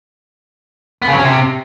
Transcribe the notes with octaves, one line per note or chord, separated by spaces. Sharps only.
B3
C#3
F#3
C#4
C3